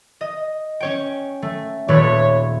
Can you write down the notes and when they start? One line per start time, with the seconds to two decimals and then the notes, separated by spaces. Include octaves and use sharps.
0.21 D#5
0.80 C#4 C#5 G5
1.42 A3
1.88 D#1 A3 B4 C#5